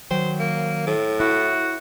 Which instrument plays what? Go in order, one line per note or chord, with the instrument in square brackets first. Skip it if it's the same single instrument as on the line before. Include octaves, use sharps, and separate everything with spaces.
[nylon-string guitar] D#3 F#3 G5 [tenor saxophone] C5
[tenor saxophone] A#3
A2
[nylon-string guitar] E4 [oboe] F#4